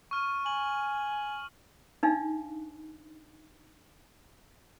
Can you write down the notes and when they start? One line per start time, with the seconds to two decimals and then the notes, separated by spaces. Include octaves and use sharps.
0.11 C#6 F6 D#7
0.46 G#5 F#7
2.03 D4 D#4 F5